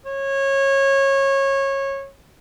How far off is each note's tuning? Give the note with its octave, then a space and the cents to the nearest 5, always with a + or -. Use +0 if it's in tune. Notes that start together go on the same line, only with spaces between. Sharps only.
C#5 -20